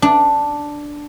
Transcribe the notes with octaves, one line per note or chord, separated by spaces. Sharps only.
D4